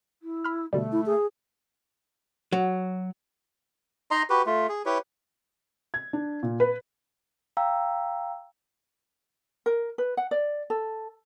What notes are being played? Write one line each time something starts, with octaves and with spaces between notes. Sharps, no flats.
E4
B5 F6
B2 D3 G3 A3
E4
G#4
F#3
D#4 D#5 A#5 C6
F#4 G4 B4
A3 F4
G#4
E4 G4 B4 C#5
G#6
D4
A#2
B4
F5 G5 A#5 E6
A#4
B4
F#5
D5
A4